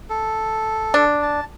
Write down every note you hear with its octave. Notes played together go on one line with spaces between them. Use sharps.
A4
D4
A5